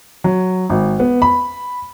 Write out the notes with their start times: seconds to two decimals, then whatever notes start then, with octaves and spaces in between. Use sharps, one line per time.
0.24 F#3
0.70 G#1
1.00 B3
1.22 B5